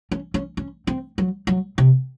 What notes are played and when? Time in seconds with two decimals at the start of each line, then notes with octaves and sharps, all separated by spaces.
0.11 C#4
0.34 C#4
0.57 C#4
0.87 C4
1.18 F#3
1.47 F#3
1.78 C3